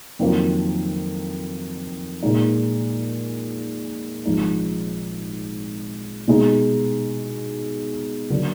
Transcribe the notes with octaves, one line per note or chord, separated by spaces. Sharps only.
F2 D#3 F#3 A#3 F4
A#2 G#3 D#4
G#1 G#2 F3 G#3 D#4
B2 G#3 D#4
D3 F#3 A#3